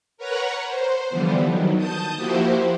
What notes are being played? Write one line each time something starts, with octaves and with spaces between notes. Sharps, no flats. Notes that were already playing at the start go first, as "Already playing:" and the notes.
A#4 B4 C#5 F#5 A#5
C5
D3 E3 F3 G3 B3
D#3 F#3
A5 D#6 G6
F3 A#3 E4 F#4 G4 C5